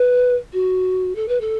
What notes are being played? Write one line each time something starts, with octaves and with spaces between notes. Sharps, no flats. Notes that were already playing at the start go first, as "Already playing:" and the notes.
Already playing: B4
F#4
A4
B4
A4